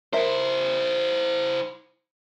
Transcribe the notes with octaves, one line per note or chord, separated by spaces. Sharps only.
E4 A#4 C5 E5